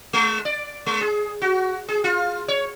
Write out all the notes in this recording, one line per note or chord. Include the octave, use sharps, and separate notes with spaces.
G#3
D5
G#3
G#4
F#4
G#4
F4
C#5